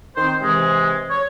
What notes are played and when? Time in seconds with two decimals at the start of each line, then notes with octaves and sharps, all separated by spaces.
0.16 D#3 C4 C5
0.41 C3 E3 G#3
1.10 C#5